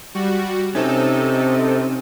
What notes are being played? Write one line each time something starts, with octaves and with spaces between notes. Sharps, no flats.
G3 F#4
C3 C4 C#4 D#4 A4